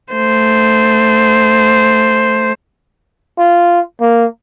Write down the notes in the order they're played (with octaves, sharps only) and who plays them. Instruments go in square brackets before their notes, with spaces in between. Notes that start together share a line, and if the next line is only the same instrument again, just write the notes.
[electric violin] A3 C5
[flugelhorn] F4
A#3